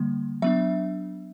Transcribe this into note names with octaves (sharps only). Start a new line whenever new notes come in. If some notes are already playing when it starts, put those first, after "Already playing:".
Already playing: D3 G3 A#3
F#3 B3 D4 E5